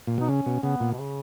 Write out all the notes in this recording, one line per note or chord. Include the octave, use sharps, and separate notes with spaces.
A#2
B2 D#4
C#3 C#4
B2
C#3 B3
A#2
B2
C#3